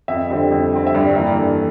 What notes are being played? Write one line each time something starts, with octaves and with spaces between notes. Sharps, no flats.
F2 E5
D3 G3 C4
F2
D3 G3 C4
E5
G2 D5
D5
E3 A#3 E5
D5
G2 A4